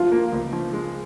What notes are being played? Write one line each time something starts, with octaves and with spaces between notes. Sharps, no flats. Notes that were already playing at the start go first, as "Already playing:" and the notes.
Already playing: F3 F4
A#3
C#2
F3
G#3